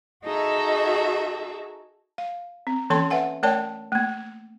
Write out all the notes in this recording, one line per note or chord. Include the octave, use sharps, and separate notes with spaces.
D#4 F#4 G#4 A4 E5
F5
C4
E3 A#3 C#4 A4 A5 C6
B4 E5 F#5 G#5
A3 A#4 C#5 D5 G5 A5
A3 A#3